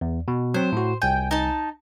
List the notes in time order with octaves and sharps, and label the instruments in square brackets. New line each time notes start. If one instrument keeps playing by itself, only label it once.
[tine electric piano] E2
B2
[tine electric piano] F#3 C4 [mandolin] C5
[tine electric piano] A2 F#4
[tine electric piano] C2 G#5 [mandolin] G5
[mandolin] D#4 A5